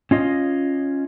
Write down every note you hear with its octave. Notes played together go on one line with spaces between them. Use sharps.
C#4 F4 D#5